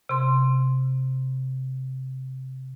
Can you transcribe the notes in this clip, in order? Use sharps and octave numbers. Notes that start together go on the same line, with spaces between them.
C3 C6